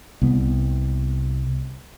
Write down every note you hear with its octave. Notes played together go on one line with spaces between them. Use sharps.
C2 B3